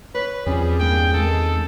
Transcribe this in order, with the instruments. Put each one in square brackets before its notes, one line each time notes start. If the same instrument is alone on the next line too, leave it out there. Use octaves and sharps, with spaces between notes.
[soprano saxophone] B4 [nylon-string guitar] C#5
[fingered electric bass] E2 C4 C#4 [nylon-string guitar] F3 [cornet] G3 [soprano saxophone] G#4
[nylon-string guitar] G2 E3 A#3 [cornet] G5
[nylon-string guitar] D#3 G#3 [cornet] A4